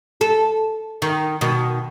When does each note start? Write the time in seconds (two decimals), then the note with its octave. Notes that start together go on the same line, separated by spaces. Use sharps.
0.21 A4
1.02 D#3
1.41 B2 D#3